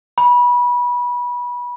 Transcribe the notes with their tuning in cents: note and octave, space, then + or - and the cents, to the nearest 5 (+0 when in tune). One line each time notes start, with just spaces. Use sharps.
B5 -25